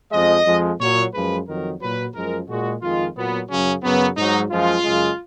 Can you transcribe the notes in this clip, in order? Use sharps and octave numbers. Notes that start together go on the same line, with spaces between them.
F2 F3 G#3 D#5
F2 F3 G#3
A#2 F#3 C#5
F#2 F3 G#3 B4
F2 D#3 F#3 A#4
A#2 F#3 B4
F#2 F3 G#3 A#4
A#2 G#3 F#4
F2 D#3 G#3 F4
A#2 F#3 B3
F#2 C#3 F#3 C#4
F#2 C#3 F#3 B3
G#2 F#3 D#4
F#2 F3 G#3 F4
F#2 C#3 G#3